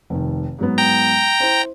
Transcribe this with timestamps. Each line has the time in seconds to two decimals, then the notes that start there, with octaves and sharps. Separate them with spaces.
0.10 F1 D#3
0.59 G#2 F#3 B3
0.78 G5 A#5
1.40 E4 C5